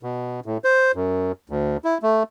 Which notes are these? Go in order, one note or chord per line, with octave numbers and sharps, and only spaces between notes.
B2
A2
C5
F#2
D2
E4
A3